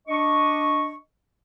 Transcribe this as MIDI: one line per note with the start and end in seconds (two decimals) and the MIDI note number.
0.08 0.94 62
0.08 0.94 75
0.08 0.94 85